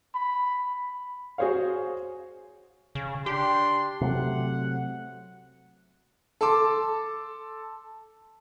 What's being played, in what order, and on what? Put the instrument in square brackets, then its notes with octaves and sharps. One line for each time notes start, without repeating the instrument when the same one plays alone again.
[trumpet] B5
[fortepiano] F#4 G#4 C5 C#5 F5
[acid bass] C#3
[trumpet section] D4 C6 [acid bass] G4
[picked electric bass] C3 F#3 A3 [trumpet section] F#5
[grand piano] A4 A5 C6 D6